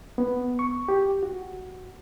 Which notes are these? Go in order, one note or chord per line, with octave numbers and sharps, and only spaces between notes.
B3
C#6
G4
F#4